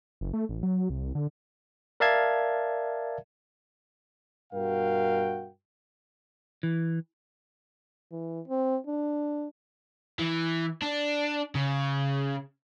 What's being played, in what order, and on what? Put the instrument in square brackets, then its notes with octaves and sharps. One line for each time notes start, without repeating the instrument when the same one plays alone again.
[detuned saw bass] F#1
A3
A1
F#3
C2
D3
[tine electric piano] A#4 D5 E5 F5 A5 G#6
[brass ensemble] G2 B2 F#4 A#4 F5 G5
[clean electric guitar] E3
[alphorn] E3
C4
D4
[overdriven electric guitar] E3
D4
C#3